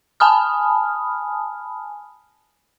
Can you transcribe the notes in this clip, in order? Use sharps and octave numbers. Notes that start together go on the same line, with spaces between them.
G#5 A5 B5 D#6 F6